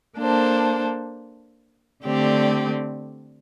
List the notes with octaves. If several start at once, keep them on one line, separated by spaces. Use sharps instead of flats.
A#3 D4 A4 C5
D3 A3 C4 G4 D5